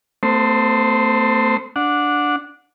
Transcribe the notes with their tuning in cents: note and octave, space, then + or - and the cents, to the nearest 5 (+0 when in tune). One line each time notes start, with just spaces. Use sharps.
A3 +20 C4 -45 C5 +0
D4 +0 F#5 -20